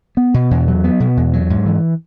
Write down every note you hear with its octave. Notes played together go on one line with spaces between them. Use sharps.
B3
B2
E2
F#3
B3
B2
E2
F#3
G#2
E3